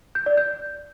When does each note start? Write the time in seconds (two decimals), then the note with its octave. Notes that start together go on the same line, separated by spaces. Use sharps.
0.15 G6
0.26 D5
0.37 G6